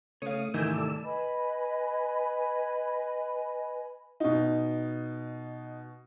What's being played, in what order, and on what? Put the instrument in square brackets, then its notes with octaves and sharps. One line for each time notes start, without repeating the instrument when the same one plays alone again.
[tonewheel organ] C#3 A3 D#6 [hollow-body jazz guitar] C#5 F5
[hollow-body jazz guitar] C2 G#2 E3 [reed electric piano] D#3 A3 [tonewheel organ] G5 G#5 E6
[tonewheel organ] A4 D5 E6
[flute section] B4 D#5 G#5 B5
[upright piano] B2 D#4